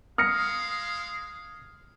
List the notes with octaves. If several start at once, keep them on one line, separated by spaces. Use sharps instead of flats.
G#3 F5 D#6 F6 A#6 C#7